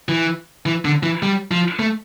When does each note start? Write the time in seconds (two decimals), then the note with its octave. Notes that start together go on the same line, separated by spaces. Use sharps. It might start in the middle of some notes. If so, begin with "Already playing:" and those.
0.09 E3
0.66 E3
0.85 D3
1.03 E3
1.23 G3
1.51 F3
1.79 A3